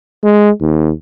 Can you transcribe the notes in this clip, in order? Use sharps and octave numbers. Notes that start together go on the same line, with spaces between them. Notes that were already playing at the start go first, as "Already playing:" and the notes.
G#3
D#2